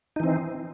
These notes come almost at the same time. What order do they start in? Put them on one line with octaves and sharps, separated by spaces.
D#4 E3 C4